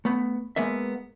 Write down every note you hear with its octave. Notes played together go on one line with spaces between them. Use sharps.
A3 B3
G#3 A#3 B3 E5